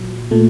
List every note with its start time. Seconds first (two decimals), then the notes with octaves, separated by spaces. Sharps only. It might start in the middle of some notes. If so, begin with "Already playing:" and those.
Already playing: A#2 F#3
0.31 A#2 A3